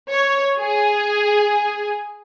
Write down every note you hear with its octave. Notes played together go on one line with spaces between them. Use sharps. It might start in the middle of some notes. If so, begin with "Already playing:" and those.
C#5
G#4